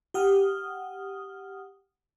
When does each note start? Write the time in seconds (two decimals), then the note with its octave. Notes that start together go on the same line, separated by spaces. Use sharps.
0.14 G4 F#5 D#6 F6